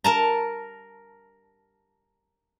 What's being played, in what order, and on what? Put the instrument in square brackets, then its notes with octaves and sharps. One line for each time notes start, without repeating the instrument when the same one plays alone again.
[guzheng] A#4 A5 A#5